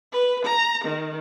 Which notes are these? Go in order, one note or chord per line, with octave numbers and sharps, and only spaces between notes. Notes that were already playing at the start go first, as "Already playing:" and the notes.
B4
A#5
D#3